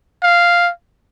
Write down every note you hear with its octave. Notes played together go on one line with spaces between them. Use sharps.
F5